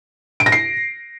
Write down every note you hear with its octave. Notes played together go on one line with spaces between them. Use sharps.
D7
A#6
C7